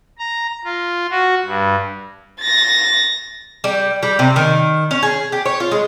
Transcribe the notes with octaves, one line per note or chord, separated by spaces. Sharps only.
A#5
F4
F#4
G2
A6 A#6
G3
G3
C3
D#3
C#4
G#4
G4
C#5
F4
G#3